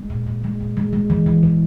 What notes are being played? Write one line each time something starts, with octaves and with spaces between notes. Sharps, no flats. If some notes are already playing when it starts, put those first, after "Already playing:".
Already playing: G#3
A#2
A#2
G#3
A#2
G#3
G#3
E3
E3
E3